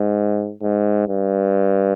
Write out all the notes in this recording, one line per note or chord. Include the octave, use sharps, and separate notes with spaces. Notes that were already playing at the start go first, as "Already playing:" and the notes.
Already playing: G#2
G#2
G2